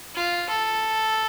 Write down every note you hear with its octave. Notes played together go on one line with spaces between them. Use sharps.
F4
A4